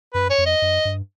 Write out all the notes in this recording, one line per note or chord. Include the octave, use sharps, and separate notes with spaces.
F#2 B4
C#5
F2
D#5
F#2
G2